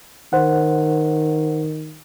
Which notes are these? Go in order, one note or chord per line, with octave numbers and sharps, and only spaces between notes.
D#3 C5 F#5